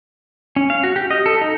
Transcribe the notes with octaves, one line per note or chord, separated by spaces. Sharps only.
C#4
F5
F#4
G4
D#5
A4
D#4